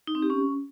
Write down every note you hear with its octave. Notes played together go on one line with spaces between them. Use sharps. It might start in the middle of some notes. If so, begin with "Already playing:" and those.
D#4
C4
G4
C#4